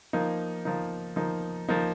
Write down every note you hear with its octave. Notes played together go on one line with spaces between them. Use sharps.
F3 A#3 D#4
F3 A#3 D#4
F3 A#3 D#4
F3 A#3 D#4